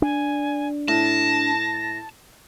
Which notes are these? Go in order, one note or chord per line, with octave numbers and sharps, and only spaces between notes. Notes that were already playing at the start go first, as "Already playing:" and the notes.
D4 G#5
A2 A5 A#6